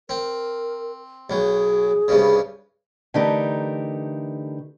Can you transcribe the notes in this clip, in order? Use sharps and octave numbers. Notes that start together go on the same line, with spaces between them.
C4 A#4
B1 F#3 G#4
C2 G2 C#3
D3 E3 A3 D#4 G4 A#4